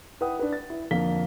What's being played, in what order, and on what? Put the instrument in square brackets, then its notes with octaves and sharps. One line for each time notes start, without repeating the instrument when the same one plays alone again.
[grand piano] E4 B4 F#5 G5 D#6
D4 B4
A6
E4
F2 D3 A#3 F5 B6 G7